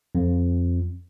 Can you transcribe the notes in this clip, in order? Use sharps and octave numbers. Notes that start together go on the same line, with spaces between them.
F2